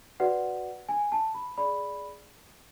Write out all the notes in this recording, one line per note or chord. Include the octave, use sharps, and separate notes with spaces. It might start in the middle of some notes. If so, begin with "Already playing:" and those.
F#4 B4 D5 F#5
G#5
A5
B5
G#4 D5 B5